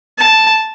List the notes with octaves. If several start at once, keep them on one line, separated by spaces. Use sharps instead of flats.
A5